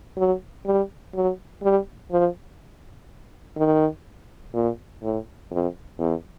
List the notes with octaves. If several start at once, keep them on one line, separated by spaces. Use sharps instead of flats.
F#3
G3
F#3
G3
F3
D#3
A#2
A2
F2
E2